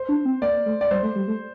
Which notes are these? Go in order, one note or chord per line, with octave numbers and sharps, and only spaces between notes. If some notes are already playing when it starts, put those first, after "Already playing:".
Already playing: C5
D4
C4
A#3 D5
A3
D5
G3 C5
A3
G3
A3